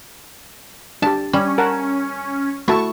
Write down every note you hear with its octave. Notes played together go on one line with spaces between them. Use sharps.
D4 G4 A5
G3 C#4
A#4 F#5 A5
A3 E4 F#4 A5 C#6